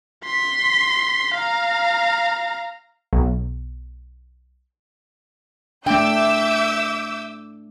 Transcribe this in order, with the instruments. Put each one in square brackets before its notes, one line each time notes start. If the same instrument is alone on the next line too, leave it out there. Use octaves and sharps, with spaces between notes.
[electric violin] C6 B6
F5 A#5
[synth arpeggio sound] B1
[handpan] A3 D4 [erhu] E5 [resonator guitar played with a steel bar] G5 [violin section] D6 E6 G6